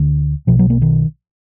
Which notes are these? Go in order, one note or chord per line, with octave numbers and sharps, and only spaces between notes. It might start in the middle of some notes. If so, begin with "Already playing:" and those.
Already playing: D2 D3
B1 B2 F3
F#3
A#3
D#3